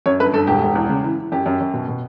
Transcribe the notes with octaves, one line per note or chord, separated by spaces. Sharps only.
F#2 C#5
G1 B4
G1 A4
E1 G4
E1
E2
C#3
E3
E3
F#2 G4
F#2
F#2
B2
B2